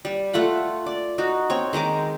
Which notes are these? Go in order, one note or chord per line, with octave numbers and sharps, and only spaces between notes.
G3
A3 F4 F#5 B5
D5
D#4 F#4
C4 C#5
D#3 G#3 A#5 D6